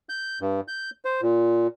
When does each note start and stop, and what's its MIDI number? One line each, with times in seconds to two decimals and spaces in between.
0.09 0.39 91
0.41 0.61 43
0.68 0.90 91
1.05 1.21 72
1.22 1.67 46